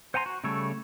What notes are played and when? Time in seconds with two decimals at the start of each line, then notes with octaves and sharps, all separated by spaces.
0.14 C5 F#5 G#5 A#5 C6
0.26 F#4
0.44 C#3 G3 A3 A4 C#5